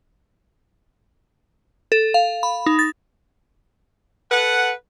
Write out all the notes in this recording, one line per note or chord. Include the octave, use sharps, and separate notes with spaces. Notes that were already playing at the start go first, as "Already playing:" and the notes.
A4
F5
B5
D#4
A6
A4 B4 F#5